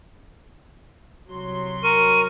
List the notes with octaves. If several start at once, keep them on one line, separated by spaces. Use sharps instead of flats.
C2 F#3 C6
A#4 C#6 D#7